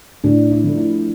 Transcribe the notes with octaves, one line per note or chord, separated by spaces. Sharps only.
A2 D4
E4
F3 A3
E4